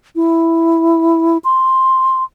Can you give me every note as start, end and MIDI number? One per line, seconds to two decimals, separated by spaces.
0.16 1.38 64
1.44 2.24 84